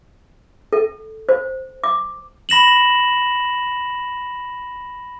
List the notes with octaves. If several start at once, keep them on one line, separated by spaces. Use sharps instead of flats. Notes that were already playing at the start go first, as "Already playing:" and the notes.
A4
C5
D6
B5 A#6 E7 F#7